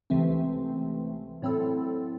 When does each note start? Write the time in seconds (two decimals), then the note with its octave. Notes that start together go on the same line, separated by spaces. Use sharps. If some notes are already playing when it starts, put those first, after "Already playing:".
0.10 C#2 C3 E3 A3 C4
1.42 A2 F#3 C4 E4 A4